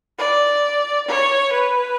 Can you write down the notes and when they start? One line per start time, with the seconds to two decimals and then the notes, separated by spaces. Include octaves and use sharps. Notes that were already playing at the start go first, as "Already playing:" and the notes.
0.19 D5
1.08 C#5
1.53 B4